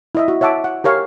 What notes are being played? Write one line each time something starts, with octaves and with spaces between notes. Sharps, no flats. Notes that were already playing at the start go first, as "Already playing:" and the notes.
E4 D#5 E5
F#4
C#5 E5 F#5 A5 D6
F#5
G4 A#4 C#5 F5 G#5